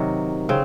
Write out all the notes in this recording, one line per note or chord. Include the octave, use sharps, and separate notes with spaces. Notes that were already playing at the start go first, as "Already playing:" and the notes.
Already playing: C3 D#3 F#3
C#3 C4